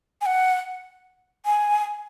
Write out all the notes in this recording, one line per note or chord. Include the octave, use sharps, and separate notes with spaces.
G#5
F#5
G#5